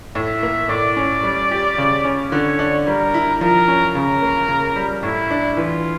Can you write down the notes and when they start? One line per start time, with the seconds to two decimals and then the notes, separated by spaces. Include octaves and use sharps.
0.15 A2 E5
0.43 A#3
0.69 A2 D5
0.97 C#4
1.23 G3
1.51 G4
1.78 C#3
2.05 C#4
2.32 D3 C#5
2.59 D4
2.87 G3 A#4
3.14 E4
3.41 F3 A#4
3.68 C#4
3.95 C#3 A#4
4.22 A#3
4.48 C#3
4.76 G3
5.03 A2 E4
5.30 D4
5.57 E3 F4